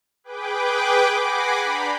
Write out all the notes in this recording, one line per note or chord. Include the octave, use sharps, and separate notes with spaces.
G#4 B4 G5 D6
F#5 G#5 B5 D6 A#6 C7
D4 A#5 B5 G6